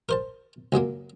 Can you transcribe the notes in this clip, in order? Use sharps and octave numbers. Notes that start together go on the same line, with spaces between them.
A#4 C5 A5
C#2 F#2 F#3 A#3